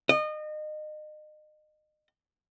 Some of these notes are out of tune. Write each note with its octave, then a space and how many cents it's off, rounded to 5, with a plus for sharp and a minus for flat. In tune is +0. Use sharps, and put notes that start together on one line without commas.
D#5 -30